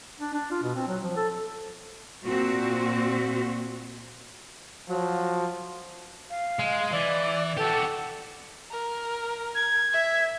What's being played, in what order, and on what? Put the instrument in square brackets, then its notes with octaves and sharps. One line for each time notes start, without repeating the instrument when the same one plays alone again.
[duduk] D4
D4
F4
B2
C4
F#3
F3
A4
[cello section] A#2 C4 F#4
[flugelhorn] F3 [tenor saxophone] F#3
[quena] F5
[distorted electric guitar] G#3
[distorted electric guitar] E3 [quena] D5
[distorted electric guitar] F#4 G4 [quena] A4
[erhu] A#4
[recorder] G#6
[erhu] E5